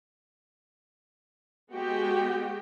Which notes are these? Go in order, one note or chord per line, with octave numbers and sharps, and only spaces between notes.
G#3 B3 F#4 G4 G5